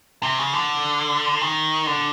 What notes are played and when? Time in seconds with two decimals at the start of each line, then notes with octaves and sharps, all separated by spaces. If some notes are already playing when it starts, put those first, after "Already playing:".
0.23 C3
0.39 C#3
0.53 D3
1.41 D#3
1.87 D3